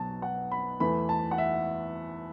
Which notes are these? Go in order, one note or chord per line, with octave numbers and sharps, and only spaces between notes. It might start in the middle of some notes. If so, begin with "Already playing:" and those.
Already playing: B1 B2 F#3 A5
F#5
B5
E2 E3 A3 B5
A5
F#5
E5